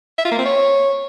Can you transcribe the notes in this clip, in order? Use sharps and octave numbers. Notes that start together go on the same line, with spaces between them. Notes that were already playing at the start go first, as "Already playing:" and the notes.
E5
F4
A#3
C4
C#5